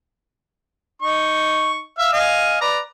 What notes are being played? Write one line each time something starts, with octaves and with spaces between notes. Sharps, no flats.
D#4 C#6
E5 F5
D#5 F5 G#5
B4 D5 A#5